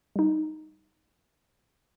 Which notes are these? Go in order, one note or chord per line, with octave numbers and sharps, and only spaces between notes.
G3 D#4